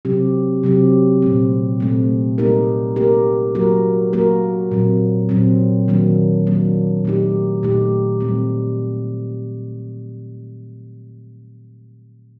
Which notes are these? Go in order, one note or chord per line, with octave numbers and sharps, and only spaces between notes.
C3 F#3 C4 G4
C3 F#3 C4 G4
A#2 A3 C4
A#2 A3 C4
G3 A#3 D#4 G4 A#4
G3 A#3 D#4 G4 A#4
F#3 A#3 F#4 A#4
F#3 A#3 F#4 A#4
A#2 F#3 C4
A#2 F#3 C4
D#3 F#3 A#3 D4
D#3 F#3 A#3 D4
A#2 A3 D#4 G4
A#2 A3 D#4 G4
A#2 G3 C4